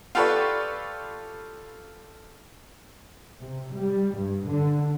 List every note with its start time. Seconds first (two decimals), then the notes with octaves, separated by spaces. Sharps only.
0.15 F4 G4 A4 B4 D5 C#6
3.39 C3
3.76 G3
4.17 G2
4.49 D3